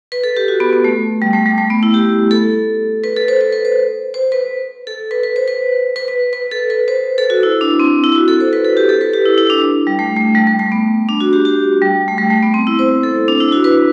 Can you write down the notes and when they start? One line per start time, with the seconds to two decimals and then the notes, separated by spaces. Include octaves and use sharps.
0.12 B4
0.24 A4
0.37 G4
0.48 F#4
0.60 B3
0.73 B3
0.84 A3
1.22 G3
1.33 A3
1.46 G3
1.58 A3
1.70 B3
1.83 E4
1.94 G4
2.31 A4
3.04 B4
3.16 A4
3.28 C5
3.41 B4
3.52 B4
3.65 C5
4.14 C5
4.32 B4
4.87 A4
5.11 B4
5.23 B4
5.36 C5
5.48 B4
5.96 B4
6.08 B4
6.33 B4
6.51 A4
6.70 B4
6.88 C5
7.18 A4
7.30 F#4
7.43 E4
7.61 D4
7.80 C4
8.04 E4
8.16 F#4
8.28 A4
8.40 C5
8.53 B4
8.65 A4
8.77 G4
8.89 A4
9.01 B4
9.13 G4
9.26 E4
9.38 E4
9.50 D4
9.87 G3
9.99 A3
10.16 A3
10.35 G3
10.47 G3
10.59 A3
10.72 B3
11.09 D4
11.20 F#4
11.33 G4
11.45 G4
11.82 G3
12.08 A3
12.18 G3
12.30 A3
12.42 B3
12.54 C4
12.67 E4
12.79 C5
13.03 A4
13.28 D4
13.40 E4
13.52 F#4
13.64 B4